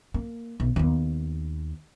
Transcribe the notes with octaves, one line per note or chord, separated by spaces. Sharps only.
A#3
B1
D#2 B3